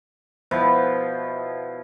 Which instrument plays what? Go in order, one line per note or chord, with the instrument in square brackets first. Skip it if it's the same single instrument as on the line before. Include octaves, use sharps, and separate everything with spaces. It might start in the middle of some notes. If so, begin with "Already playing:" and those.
[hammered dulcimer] B2 F3 E4